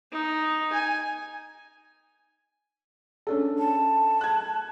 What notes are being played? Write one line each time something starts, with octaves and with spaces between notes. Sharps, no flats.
D#4
G#5
C#4 D4 A4
A5
F#6 G#6